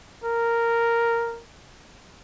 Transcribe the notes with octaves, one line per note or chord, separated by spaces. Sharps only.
A#4